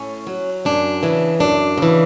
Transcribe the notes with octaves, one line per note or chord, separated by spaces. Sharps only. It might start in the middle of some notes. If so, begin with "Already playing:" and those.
Already playing: A2 C#4
F#3
F#2 D4
C#3 E3
F#2 D4
C#3 E3